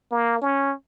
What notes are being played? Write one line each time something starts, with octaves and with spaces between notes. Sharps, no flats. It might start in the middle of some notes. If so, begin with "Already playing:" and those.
A#3
C#4